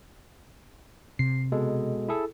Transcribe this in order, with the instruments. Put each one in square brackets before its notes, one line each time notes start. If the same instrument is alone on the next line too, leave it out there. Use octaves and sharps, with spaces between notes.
[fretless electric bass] C3 [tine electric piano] C7
[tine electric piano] B2 G#3 A4
E4 G#4 A4